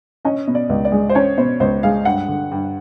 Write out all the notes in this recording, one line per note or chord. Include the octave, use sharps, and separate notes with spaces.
C#4 D#5
B2
D5
C#2
D5
G#3
C5
C#4 C#5
B2 C5
C#2 C5
G#3 F5
G2 F#5
D3
G2